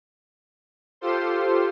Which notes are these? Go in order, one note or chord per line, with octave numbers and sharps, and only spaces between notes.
F4 G4 A4 C5 C6